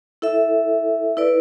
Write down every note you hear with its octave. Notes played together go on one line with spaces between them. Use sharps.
E4 A4 E5
E4 B4 D5